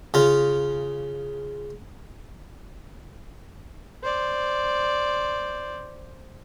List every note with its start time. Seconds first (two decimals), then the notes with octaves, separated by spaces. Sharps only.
0.14 C#3 F4
4.03 C5 D5